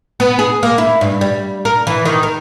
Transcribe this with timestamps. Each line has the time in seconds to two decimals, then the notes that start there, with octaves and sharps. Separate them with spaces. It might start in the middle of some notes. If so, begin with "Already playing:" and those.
0.20 B3
0.39 G#4
0.63 A#3
0.78 E4
1.01 G2
1.21 G3
1.65 A#4
1.87 E3
2.05 D#3
2.23 A#4